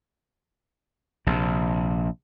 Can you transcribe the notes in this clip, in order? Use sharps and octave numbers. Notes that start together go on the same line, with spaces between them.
A#1 C3